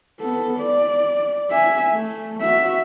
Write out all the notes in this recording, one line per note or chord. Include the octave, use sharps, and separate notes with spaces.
B3 A4
D5
E5 G#5
A3
F#4 E5